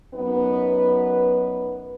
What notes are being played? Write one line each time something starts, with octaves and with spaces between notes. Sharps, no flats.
F#2 B3 D#4 B4